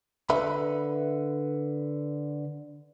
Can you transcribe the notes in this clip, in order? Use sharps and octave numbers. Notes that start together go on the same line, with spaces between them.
D3 B4 E5 B5